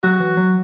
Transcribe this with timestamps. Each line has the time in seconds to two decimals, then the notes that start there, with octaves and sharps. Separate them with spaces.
0.03 F#3 F#4
0.20 E3
0.37 F#3